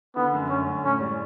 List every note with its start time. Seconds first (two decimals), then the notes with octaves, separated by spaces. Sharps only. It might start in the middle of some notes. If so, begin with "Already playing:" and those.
0.16 D3 B3
0.33 F#2
0.49 F#2 C#4
0.67 F#2
0.84 A2 C#4
1.00 G3